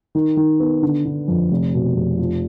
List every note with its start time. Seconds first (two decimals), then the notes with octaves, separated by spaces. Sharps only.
0.15 D#3
0.37 D#3
0.60 B3
0.82 D3
1.05 D3
1.28 F2
1.51 F1
1.74 B2
1.96 F1
2.19 F3